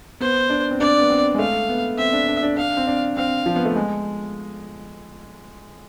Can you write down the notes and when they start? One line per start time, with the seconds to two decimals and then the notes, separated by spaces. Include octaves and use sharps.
0.20 B3 C5
0.50 D4
0.71 C4
0.80 D4 D5
0.99 B3
1.10 C4
1.34 G#3
1.39 A3 F5
1.69 B3
1.98 C4 E5
2.13 D4
2.28 D4
2.43 D4
2.57 D4 F5
2.77 C4
2.87 D4
3.16 C4 F5
3.46 F3
3.56 B3
3.65 A3
3.76 G#3